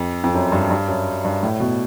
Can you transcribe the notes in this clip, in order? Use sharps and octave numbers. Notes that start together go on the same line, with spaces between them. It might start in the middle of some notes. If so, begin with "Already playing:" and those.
Already playing: F2
F2
F#2
G2
G2
F#2
G2
A2
B2